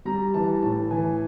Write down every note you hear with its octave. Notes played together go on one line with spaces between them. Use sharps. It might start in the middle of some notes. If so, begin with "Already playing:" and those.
G3 A#5
E3 A5
A2 A5
E3 G#5